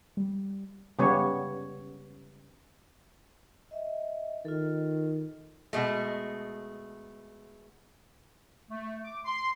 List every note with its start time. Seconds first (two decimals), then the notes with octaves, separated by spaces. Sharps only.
0.17 G3
0.99 C#3 G3 B3 C#5
3.71 D#5 E5
4.45 D#3 F4 A4
5.73 B2 G#3 A3
8.71 A3
9.05 D6
9.25 C6